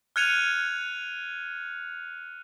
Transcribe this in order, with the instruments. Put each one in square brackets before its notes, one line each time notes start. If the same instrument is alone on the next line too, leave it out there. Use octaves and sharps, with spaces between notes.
[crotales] F6 F#6 G#6 C#7 D#7 F7